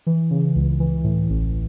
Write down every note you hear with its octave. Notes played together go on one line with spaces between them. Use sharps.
E3
C#3
C#2
E3
A2
A1